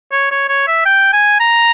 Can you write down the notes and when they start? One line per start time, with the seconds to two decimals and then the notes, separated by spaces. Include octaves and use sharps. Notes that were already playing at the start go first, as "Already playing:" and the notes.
0.12 C#5
0.31 C#5
0.49 C#5
0.67 E5
0.86 G5
1.13 G#5
1.40 A#5